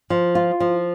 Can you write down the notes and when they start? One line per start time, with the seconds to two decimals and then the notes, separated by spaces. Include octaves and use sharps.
0.10 F3
0.35 F4
0.60 F3